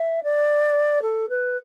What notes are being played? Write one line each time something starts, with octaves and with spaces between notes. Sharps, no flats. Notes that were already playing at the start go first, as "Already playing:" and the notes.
Already playing: E5
D5
A4
B4